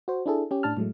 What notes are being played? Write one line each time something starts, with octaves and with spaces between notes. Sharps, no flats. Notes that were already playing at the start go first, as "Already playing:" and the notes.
F#4 C5
D4 E4 G#4 A4
C#4 G4
A2 D4 A5 F6
A2 F#3 G#3 A3